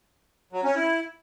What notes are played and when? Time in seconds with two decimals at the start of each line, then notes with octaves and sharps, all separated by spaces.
0.53 F#3
0.64 C#4
0.76 E4